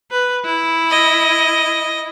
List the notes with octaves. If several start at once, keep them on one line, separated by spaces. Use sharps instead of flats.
B4
E4
D#5